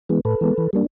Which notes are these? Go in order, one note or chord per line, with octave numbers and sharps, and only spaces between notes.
E3 G#3 B3
A2 A4 B4
E3 G#3 B3
E3
G3 A#3 D4